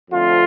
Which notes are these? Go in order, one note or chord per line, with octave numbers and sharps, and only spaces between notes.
F2 D3 F3 A3 C4 F4